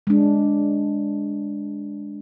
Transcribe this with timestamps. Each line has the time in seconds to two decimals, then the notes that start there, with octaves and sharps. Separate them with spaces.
0.07 G#3 D4